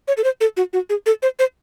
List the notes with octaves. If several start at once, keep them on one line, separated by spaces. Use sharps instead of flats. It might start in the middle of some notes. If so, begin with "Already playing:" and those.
C#5
A4
C5
A4
F#4
F#4
G#4
A4
C5
C5